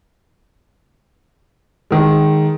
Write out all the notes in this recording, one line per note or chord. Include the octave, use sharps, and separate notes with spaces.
D#3 G#3